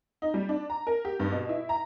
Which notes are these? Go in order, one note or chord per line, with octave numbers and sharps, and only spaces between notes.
D#4
G3
D4
A#5
A#4
G4
G2
B2
E4
A#5